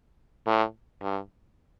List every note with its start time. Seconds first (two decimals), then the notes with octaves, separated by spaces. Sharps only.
0.47 A2
1.01 G2